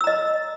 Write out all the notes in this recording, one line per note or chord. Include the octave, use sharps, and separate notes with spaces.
D#5 A#5 E6